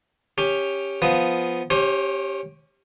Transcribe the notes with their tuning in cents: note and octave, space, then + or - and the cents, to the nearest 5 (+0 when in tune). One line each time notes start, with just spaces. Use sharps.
C#4 +0 G4 +15
F3 +0 B3 +0 D#6 +0
C#4 +0 G4 +0 C5 +40